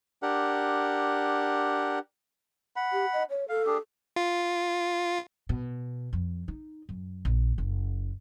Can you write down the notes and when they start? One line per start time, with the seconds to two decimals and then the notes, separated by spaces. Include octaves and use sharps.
0.22 D4 G4 A#4 F#5
2.76 F#5 B5
2.93 G4
3.13 D#5
3.30 C#5
3.49 A4 F5
3.66 D4 G4 G#4
4.16 F4
5.49 B2
6.13 F2
6.48 D#4
6.89 F#2
7.25 A#1
7.58 F#1